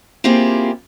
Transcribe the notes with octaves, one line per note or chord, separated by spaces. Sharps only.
A#3 C4 E4 F4 G4 G#4